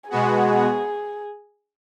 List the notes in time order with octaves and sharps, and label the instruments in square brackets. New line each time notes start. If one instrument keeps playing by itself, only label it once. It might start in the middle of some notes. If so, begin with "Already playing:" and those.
[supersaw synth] B2 G#3 B3 F#4 [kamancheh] G#4